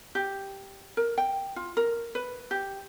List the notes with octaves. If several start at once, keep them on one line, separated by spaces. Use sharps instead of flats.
G4
A#4
G5
F4
A#4
B4
G4